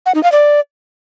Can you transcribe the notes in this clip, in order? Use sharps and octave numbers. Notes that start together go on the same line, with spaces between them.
F#5
D#4
F5
D5